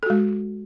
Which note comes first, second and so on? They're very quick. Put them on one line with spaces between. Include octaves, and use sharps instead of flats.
A4 F#4 G#3